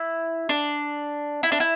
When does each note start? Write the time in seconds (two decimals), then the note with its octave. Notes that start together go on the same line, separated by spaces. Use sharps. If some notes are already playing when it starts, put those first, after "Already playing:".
Already playing: E4
0.49 D4
1.43 E4
1.52 D4
1.60 E4